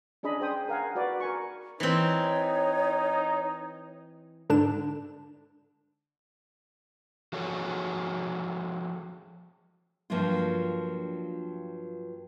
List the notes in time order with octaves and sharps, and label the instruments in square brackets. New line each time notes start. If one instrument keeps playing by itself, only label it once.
[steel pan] C#4 D4 G#4 D#5 B5
G#4 C5 G5 D#6
A#4 F5 F#5 G#5
F#4 B4 D5 F#5
A#4 G#5 C#6
[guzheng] E3 C4 [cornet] D#4 [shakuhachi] C#5
[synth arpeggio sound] G#2 D3 D4 E7
[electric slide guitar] F3 F#4 G#4 A4 C#5
[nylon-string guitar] G2 F3 F#3 A#3 D4 F4